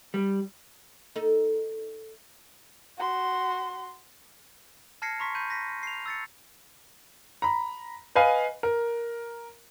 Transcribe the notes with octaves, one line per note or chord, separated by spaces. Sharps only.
G3
D#4 A4
F#4 C6
A5 F6 G#6 A#6 C7 C#7
A#5 C6 C#6 B6
B5 G6 D#7
A#6 B6
C7 F7
E6 A6 C#7
A#5 B5
B4 D#5 F5 G#5 B5
A#4